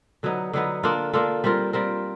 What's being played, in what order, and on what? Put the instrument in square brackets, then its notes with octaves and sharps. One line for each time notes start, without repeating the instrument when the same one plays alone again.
[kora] D3 F#3 B3 D#4
D3 F#3 B3 D#4
A#3 D4 F4 A4
A#3 D4 F4 A4
G3 C4 F4 A#4
G3 C4 F4 A#4